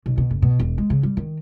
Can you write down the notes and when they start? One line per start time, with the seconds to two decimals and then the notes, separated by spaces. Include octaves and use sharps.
0.06 B1
0.18 B2
0.31 F#1
0.42 B2
0.59 E1
0.78 G#3
0.90 C#3
1.03 G3
1.17 D#3